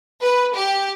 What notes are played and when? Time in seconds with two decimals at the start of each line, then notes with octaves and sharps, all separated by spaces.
0.21 B4
0.54 G4